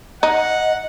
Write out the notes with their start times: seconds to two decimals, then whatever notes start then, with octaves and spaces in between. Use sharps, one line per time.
0.23 D#4 D#5 F#5